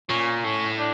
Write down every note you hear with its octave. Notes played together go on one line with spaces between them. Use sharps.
A#2 C#4
A2 C#4
D4